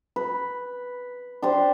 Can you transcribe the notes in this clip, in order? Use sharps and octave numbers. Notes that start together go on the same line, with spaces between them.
B4
D4 G4 C5